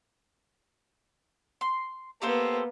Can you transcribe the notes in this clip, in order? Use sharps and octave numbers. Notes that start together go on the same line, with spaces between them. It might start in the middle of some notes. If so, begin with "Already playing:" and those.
C6
A#3 B3 G4 A4 C5